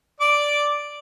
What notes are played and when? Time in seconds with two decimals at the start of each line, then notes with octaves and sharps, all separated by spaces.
0.20 D5 D6